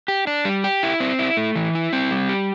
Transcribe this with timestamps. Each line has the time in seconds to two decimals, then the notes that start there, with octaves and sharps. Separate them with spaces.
0.08 G4
0.27 D4
0.45 G3
0.64 G4
0.83 E4
1.00 C4
1.19 E4
1.37 A3
1.55 E3
1.75 E4
1.93 C4
2.11 G3
2.29 G4